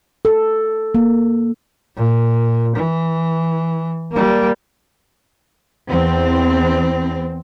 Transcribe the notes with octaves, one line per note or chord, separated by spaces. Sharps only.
A4
A#3
A#2
E3
G3 A#3
E2 C4